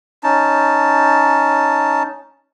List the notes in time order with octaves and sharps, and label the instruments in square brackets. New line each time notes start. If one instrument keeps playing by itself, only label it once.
[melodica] C#4 D#4 A5